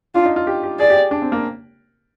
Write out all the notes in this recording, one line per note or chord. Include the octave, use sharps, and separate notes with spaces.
D4 F4
D#4
F4
G4
G4
G#4 D5
G4
D4
C4
A#3